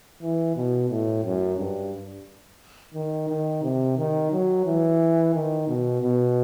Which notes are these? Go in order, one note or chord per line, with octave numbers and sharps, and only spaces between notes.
E3
B2
A2
F#2
G2
D#3
D#3
C3
D#3
F#3
E3
D#3
B2
B2